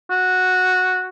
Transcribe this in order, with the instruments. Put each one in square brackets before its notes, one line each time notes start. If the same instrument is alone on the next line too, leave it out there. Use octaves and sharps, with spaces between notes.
[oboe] F#4